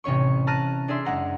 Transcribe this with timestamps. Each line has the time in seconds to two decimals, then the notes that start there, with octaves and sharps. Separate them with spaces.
0.04 A1 C3 C#4 C#5 C#6
0.47 A5 A#5 F6 F#6 A#6 D#7
0.88 D4 G#4 D5 E5 C6
1.05 F#1 G#3 F#5 A#5